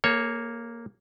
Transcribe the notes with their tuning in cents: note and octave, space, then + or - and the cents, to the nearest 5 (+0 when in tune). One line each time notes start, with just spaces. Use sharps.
A#3 +0 A4 -45 C#5 +0